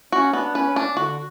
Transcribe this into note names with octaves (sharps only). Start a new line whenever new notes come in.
C#4 F#4
B3 D4
C#4 B4
C#4
D4
D3 F#4